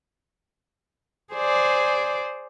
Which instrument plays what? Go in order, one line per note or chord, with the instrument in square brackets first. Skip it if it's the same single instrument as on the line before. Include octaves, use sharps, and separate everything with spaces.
[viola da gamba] G#4 C5 D5